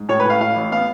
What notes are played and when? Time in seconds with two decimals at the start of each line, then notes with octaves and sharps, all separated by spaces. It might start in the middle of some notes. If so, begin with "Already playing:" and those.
Already playing: G#2
0.09 A2 C#5
0.20 B4
0.25 A2 F5
0.40 A2 F5
0.56 A1
0.72 B3 F5